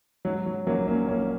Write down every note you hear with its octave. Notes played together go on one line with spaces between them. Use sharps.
G#2 F#3
F#3
A#1 F#3 A#3
A#3 C#4
A#1 A#3 C#4